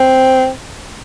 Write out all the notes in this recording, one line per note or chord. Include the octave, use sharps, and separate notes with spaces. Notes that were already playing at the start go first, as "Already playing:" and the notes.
Already playing: C4